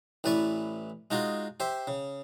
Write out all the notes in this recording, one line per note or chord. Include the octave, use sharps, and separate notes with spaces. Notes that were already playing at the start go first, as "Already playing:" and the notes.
A1 E3 B4 D5 C#6
G#3 D#4 F4 F#4
G4 C5 E5
C#3